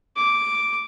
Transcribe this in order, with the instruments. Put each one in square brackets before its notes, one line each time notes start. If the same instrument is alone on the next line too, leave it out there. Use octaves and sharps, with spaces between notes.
[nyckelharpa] D6